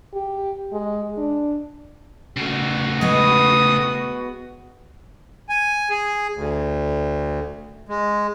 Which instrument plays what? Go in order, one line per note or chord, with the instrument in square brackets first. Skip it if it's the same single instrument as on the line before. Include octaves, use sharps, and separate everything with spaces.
[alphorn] G4
G#3
D4
[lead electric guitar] C#3 A3 [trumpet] F#4
[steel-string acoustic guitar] G#3 B3 [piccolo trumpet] D#6
[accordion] G#5
G#4
D2
G#3